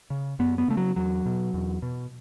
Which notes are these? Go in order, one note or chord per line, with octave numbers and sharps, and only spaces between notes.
C#3
F#2 B3
B3
C#3 A3
F#3
E2 F#3
B2
E2
B2